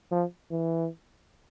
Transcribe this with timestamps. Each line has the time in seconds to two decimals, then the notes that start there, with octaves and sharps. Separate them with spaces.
0.11 F3
0.51 E3